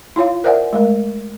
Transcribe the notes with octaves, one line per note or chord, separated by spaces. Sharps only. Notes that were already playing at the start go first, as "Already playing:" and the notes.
E4 F4 C#5 F5
A#4 C5 D5 E5 F#5 G#5
G#3 A3 A#4